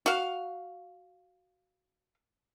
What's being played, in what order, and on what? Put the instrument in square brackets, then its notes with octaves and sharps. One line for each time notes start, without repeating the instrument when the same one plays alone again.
[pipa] F#4 F5